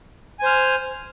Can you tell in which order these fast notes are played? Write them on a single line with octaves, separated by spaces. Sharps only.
G#5 C5 F6